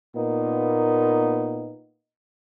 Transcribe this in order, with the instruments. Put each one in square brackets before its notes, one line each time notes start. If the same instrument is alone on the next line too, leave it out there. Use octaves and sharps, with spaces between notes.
[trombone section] A#2 A#3 B3 D#4